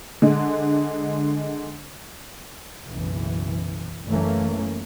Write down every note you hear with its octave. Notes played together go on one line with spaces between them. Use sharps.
D3 G#3
F#1 B1 E3
F#1 E3 A3 A#3 C#4